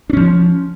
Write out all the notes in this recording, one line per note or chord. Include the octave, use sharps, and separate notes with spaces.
F3 C#4 D4